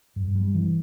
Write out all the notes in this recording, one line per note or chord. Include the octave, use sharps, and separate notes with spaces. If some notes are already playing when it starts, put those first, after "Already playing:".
G2
G3
E3